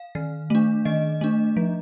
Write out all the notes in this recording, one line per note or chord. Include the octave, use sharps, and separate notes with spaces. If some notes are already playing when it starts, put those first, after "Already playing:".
Already playing: F5
D#3
A3 D4
D#3 D#5
A3 D4
F3